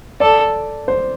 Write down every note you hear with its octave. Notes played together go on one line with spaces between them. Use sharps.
A4 D5
C5